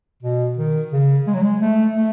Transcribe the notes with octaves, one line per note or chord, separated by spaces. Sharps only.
B2
D#3
C#3
G#3
F#3
G#3
A3
A3